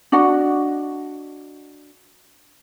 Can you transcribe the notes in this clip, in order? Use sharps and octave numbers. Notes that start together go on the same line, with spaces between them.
D4 F#4 D#5 F#5